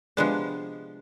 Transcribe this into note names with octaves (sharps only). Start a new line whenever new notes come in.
C3 F3 G#3 B3 D4